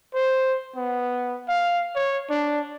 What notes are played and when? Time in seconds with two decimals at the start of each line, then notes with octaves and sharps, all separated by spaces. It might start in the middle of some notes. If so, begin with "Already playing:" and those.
0.14 C5
0.76 B3
1.48 F5
1.96 C#5
2.30 D4